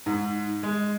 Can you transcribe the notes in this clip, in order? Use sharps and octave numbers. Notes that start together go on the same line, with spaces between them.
G#2
G#3